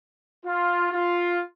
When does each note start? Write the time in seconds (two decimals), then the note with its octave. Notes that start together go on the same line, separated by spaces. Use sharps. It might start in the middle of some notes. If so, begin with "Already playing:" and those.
0.45 F4
0.92 F4